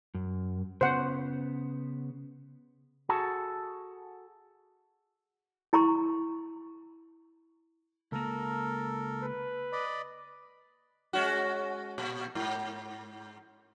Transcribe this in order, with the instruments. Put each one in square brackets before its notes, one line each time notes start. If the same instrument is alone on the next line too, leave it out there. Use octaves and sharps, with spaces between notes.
[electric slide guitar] F#2
[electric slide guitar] C#3 B3 [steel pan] C5 F#5
[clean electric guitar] F#4 G#4 A4 A5
[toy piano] E4 A#5 C6 C#6
[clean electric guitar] C#2 A#3 [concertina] A4 A#4
[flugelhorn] B4
[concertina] D5 D#5 B5
[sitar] G#3 C#4 F#4
A#2
G#2